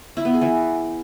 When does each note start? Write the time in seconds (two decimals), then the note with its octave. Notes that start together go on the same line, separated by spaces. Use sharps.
0.17 E4
0.25 B3
0.33 G#4
0.41 E3